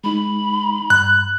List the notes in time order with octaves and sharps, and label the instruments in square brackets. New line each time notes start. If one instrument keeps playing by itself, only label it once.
[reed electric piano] G#3 D#4 [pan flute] B5
[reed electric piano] G2 [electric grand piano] F#6